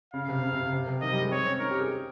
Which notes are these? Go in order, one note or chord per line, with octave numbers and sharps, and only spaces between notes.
C#3 F5
C3
C#3
C3
C#3
C3
C3
D#3 D#5
G3
G#3
C4 C#5
C#4
D#4 A#4
G4
G#4